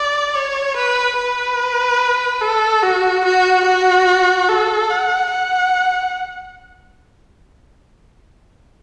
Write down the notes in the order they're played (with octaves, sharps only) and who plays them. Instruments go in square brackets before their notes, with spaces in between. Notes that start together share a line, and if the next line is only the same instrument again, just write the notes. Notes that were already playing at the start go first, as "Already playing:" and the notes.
Already playing: [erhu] D5
C#5
B4
B4
A4
F#4
F#4
F#4
A4
F#5
F#5